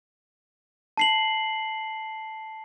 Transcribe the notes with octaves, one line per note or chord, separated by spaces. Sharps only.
A5 C7 F#7